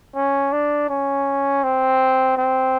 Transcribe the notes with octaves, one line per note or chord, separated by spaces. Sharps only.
C#4
D4
C#4
C4
C4